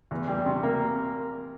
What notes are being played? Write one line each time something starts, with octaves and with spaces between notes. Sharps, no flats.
E2
G3
C3
A#3